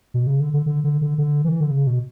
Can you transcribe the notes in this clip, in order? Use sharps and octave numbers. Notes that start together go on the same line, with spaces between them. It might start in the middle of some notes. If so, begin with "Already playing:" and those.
B2
C#3
D3
D3
D3
D3
D3
D3
E3
D3
C#3
B2